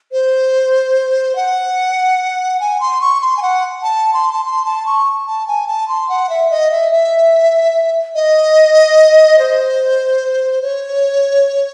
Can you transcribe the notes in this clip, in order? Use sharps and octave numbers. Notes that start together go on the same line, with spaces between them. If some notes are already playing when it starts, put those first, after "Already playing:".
C5
F#5
G#5
C6
C#6
C6
G#5
F#5
A5
C6
A5
C6
A5
C#6
A5
G#5
A5
C6
F#5
E5
D#5
E5
E5
D#5
C5
C#5